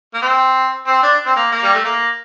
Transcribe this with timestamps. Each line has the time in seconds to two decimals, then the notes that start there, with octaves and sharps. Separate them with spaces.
0.14 A#3
0.22 C4
0.87 C4
1.03 D4
1.26 C4
1.36 A#3
1.52 A#3
1.63 G3
1.74 A3
1.84 A#3